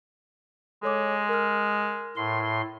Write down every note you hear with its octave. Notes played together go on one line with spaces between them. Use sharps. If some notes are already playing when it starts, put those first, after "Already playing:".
G#3 A4 C#5 D6
A#4 F6
A2 C6